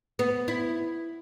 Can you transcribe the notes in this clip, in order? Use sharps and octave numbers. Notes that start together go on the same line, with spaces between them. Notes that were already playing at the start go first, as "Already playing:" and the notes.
B3
E4